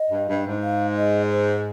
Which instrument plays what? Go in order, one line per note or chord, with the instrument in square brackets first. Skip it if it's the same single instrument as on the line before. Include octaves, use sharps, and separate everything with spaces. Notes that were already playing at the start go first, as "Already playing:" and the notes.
Already playing: [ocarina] D#5
[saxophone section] G2
G2
G#2
[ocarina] F5
D#5
C5